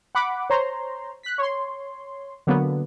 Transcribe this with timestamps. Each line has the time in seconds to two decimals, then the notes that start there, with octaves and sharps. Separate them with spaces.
0.15 F#5 B5 D6
0.50 C5 C#5 A#5 C6
1.23 F#6 B6
1.38 C#5 C6
2.47 D3 F#3 A#3 B3